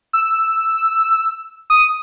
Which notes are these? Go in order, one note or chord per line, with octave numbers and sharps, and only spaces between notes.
E6
D#6